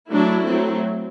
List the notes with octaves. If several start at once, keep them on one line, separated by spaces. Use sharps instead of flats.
F#3 A3 D4 E4
F#3 A3 C4